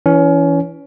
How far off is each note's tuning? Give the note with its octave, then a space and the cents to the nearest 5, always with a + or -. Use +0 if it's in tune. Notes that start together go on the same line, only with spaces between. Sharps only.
E3 +0 C#4 +25